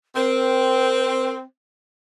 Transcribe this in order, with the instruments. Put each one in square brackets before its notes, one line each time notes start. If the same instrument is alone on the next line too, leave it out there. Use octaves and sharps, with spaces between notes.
[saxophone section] C4 [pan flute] A#4